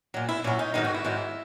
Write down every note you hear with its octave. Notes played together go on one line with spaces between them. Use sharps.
A#2 F#3
E4
A#2 F#3 C#4
D#4
G#2 D#3 F#3 D#4
F#4
E4
G#2 D#3 F#3